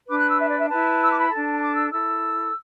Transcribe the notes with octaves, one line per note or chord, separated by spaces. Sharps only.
D4 B4 D6
F#6
E6
E5
D5
E5
E4 B4 A5
E6
D6
B5
D4 A4 A5
A5
A5
D6
E6
E4 A4 E6